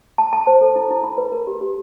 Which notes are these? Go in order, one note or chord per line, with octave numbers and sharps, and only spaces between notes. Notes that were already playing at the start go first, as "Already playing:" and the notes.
A5
A5
C5
A4
E4
E4
B5
B4
A#4
G4
G4